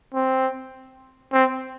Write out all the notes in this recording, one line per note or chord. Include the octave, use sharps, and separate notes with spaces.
C4
C4